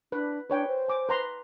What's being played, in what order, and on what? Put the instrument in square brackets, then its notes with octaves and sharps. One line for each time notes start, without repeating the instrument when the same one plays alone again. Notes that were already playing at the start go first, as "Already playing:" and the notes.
[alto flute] D4 [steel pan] B4
[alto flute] D4 [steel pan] B4 C#5 G5
[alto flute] C5
[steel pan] G#5 D6
B4 A#5 C6